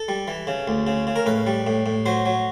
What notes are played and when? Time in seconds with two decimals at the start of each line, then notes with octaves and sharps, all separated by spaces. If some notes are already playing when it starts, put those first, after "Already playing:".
Already playing: A4
0.08 G3
0.28 E3
0.47 C#3
0.68 D2
0.87 C#3
1.07 C#3
1.16 A#4
1.26 A2 B4
1.47 G3
1.67 A2
1.86 A2
2.06 F#3 C5
2.26 F#3